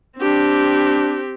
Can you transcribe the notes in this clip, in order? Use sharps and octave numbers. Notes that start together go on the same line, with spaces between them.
C4 D4 G4